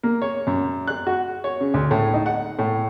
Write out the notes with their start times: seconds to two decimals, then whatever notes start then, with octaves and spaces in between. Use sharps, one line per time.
0.03 A#3
0.22 C#5
0.47 F#2
0.87 F#6
1.07 F#4
1.44 C#5
1.61 C#3
1.74 D2
1.91 A2
2.14 D#4
2.26 F#5
2.59 A2